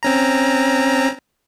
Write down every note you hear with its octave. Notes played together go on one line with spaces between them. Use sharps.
C4 C#4 A#5